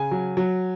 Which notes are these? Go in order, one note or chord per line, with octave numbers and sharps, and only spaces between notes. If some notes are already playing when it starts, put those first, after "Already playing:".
Already playing: C#3 G#5
F#3
F#3